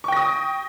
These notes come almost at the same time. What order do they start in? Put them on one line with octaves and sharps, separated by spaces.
C#6 G5 A#6 D#6